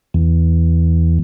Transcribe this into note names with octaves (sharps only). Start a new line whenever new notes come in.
E2